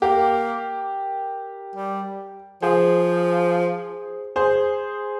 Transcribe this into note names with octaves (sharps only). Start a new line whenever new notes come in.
A#3 G4 A#4
G3
F3 G#4 C5
G#4 C5